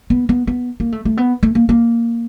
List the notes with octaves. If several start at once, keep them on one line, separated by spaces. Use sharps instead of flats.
B3
B3
B3
A#3
A3
A3
B3
A3
A#3
A#3